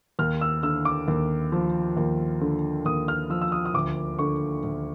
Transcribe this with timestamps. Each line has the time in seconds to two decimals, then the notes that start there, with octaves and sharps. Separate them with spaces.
0.19 D#2 F6
0.41 E6
0.63 D3 E6
0.85 D6
1.08 D#2
1.52 F3
1.97 D#2
2.41 D3
2.85 D#2 D#6
3.08 F6
3.30 F3 E6
3.41 E6
3.52 D#6
3.65 D#6
3.74 D2 D6
4.19 D3 C#6
4.64 D2